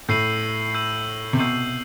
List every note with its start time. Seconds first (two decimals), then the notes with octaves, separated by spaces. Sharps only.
0.09 A2 E6 G6 C7 D#7 F#7
0.74 E6 G6 C7 D#7 F#7
1.33 C3
1.39 B2 E6 G6 C7 D#7 F#7